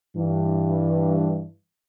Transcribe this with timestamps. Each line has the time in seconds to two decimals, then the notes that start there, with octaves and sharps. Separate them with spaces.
0.16 G2 E3